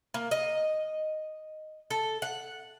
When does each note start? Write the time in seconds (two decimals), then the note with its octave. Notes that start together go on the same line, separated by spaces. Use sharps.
0.14 A#3
0.31 D#5
1.91 A4
2.22 F#5